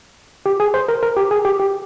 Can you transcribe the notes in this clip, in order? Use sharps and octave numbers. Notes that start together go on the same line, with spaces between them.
G4
G#4
C5
A#4
A#4
G4
G#4
G4
G4